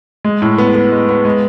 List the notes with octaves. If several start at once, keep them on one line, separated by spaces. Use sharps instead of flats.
G#3
A2
B3
B3
G#3
B3
G#3